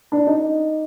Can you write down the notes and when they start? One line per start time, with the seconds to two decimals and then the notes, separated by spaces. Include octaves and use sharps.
0.12 D4
0.27 D#4